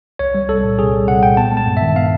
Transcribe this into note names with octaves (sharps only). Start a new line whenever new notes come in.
C2 C#5
G3
C2 A4
A#2
C2 G#4
G3
C2 F#5
A#2 G5
B3 A5
G#3
A5
G2
D#3 E5
B3 F5